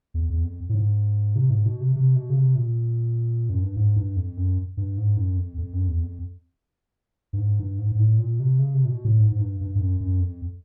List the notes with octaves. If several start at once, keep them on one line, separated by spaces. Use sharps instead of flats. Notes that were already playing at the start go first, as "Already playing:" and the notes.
E2
E2
F2
A2
G#2
C3
G#2
B2
C3
C3
B2
C#3
C3
A#2
F#2
G2
G#2
G2
F2
F#2
G2
G#2
F#2
F2
F2
F#2
E2
F2
G2
G#2
G2
G#2
G#2
A2
A#2
C3
C#3
C3
A#2
B2
A2
G#2
G#2
G2
G2
G2
F#2
F#2
F2